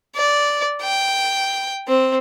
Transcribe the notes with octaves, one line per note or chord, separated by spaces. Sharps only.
D5
G5
C4